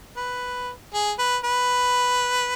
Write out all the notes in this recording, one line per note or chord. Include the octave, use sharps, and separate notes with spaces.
B4
G#4
B4
B4